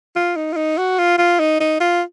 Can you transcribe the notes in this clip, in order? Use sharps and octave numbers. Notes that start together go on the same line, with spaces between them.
F4
D#4
F4
D#4
F#4
F4
F4
D#4
D#4
F4